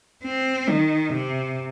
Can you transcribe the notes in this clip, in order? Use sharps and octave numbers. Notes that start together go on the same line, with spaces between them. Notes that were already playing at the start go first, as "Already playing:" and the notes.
C4
D#3
C3